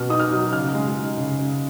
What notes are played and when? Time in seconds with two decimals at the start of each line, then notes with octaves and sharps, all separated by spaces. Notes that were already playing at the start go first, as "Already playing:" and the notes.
Already playing: B2 B3 F6
0.10 D#4 D#6
0.19 F6
0.30 F#3
0.52 C#3 F6
0.74 G#3
0.96 D#4
1.17 C#3
1.39 C#3